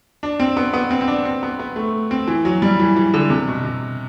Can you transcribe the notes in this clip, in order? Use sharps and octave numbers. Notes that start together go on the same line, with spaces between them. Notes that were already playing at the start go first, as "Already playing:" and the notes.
D4
C4
B3
B3
C4
C4
D4
C4
B3
B3
A3
C4
E3
F#3
G3
E3
E3
D3
C3
B2
C3